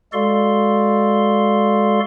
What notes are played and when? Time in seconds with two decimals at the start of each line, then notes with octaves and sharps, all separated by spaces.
0.13 G#3 F#4 A4 D5 F5 C6